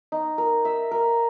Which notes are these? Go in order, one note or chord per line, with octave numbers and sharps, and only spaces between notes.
D#4
A#4
E5
A#4